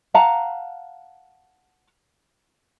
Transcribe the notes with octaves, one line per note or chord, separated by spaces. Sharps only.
F5 F#5 A5 A#5